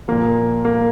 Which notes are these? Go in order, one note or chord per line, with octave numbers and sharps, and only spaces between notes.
A#2 F3 A#3
A#3